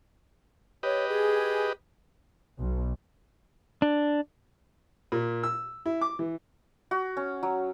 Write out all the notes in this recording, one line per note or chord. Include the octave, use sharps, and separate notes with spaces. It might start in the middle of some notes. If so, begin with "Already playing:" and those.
G4 B4 C#5 D#5
G#4
B1
D4
A#2
E6
E4
D6
E3
F#4
C#4
F#3